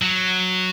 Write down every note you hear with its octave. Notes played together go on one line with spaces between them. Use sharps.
F#3